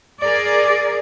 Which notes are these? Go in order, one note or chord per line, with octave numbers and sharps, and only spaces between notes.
G#4 A#4 D5